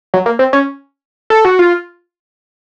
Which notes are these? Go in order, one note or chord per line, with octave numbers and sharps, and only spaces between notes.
F#3
A#3
C4
C#4
A4
F#4
F4